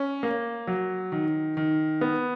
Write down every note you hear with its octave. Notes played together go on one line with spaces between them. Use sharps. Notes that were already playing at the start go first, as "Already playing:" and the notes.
Already playing: C#4
A#3
F#3
D#3
D#3
B3